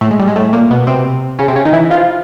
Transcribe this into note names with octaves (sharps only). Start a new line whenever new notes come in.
A2 A3
G#3
G3
G#3
A2 A3
A#2 A#3
B2 B3
C3 C4
C#3 C#4
C3 C4
C#3 C#4
D#3 D#4
E3 E4
F3 F4